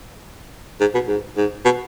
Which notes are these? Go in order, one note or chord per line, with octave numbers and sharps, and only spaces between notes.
G#2
B2
G#2
G#2
B2